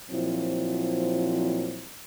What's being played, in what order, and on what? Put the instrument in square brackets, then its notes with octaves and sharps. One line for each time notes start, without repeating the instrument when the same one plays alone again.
[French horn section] A#2 F3 F#3 C4 E4